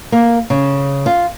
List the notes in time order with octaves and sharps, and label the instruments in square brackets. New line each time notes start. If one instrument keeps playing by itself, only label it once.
[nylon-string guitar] A#3
C#3
F4